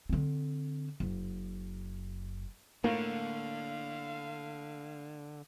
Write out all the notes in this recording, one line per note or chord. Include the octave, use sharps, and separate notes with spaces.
D3 C4
F#1
A2 D3 A#3 F5